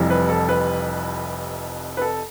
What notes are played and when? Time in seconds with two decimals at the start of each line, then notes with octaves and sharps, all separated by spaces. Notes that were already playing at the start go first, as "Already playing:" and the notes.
Already playing: F1 F2 C3 E3 G3
0.10 B4
0.29 A4
0.49 B4
1.97 B4
2.02 A4